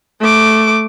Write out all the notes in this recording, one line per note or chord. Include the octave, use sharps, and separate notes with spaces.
A3 D6